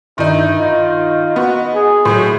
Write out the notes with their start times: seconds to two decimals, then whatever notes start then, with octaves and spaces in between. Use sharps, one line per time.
0.18 G2 D#3 D#4 E4
0.59 F4 D#5
1.36 B3 F#4
1.75 G#4
2.05 A2 F#3 C6